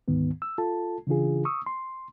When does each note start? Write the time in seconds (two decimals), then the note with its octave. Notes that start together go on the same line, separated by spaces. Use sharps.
0.08 D2 G#2 D#3 B3
0.42 E6
0.58 F4 A4 A5
1.07 C#3 E3 D4 F4 G#4
1.45 C#6 D#6 E6
1.66 C6